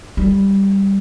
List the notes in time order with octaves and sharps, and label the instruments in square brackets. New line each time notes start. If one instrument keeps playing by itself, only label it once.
[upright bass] G3